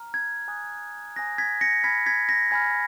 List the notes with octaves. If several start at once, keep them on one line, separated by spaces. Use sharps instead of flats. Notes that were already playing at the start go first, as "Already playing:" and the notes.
Already playing: A#5 F6
G#6
G#5 D#6 F#6
G#5 D#6 F#6 A#6
G#6 B6
A#6 C#7
G#5 B5 F6 G#6 B6
G#6 B6
A#6
G#5 B5 F6 G#6